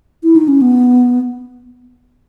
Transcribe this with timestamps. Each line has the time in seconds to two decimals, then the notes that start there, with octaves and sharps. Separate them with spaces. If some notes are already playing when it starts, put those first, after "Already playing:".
0.23 E4
0.36 D#4
0.48 C#4
0.61 B3